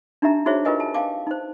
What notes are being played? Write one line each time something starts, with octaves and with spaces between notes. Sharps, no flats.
D4 D#4 G4 E5 A#5
D#4 F#4 G#4 C5 C#5 E5
F4 G4 A#4 B4 D#5 G#5
A5
F5 G5 A5 D6
D#4 C5